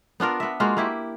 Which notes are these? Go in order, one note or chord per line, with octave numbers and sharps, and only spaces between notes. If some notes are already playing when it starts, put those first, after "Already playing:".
B3 D4 F4 A#4
B3 E5
G#3 A#3 F4 F#4
A#3 E4 G4